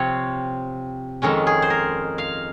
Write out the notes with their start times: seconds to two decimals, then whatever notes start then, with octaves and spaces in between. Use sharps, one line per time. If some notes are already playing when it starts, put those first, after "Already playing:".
Already playing: C3 F3 C4 C#5
1.22 F2 D#3 G#3 C#4
1.47 G#4
1.62 C5
1.70 A#4
2.18 F5